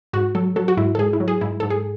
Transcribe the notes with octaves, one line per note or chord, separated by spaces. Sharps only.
G#2 F#4
F#3 A4
F#3 A4
F#4
G#2 E4
A4
G#2 G#4
E4
F#3
G#4
G#2 E4
G#2 A4
G#4